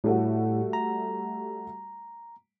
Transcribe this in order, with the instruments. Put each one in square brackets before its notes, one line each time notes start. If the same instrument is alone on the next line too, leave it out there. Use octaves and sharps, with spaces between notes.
[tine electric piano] A2 [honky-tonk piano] G3 A3 F#4
[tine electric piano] A#5